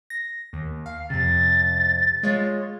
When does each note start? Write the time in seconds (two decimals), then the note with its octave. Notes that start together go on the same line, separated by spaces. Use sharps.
0.10 A#6
0.53 D#2
0.86 F5
1.10 F2 C3 A6
2.23 G#3 F4 C#5